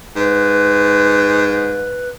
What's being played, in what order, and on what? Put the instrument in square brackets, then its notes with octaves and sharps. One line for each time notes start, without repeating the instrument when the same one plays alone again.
[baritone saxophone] G#2 [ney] B4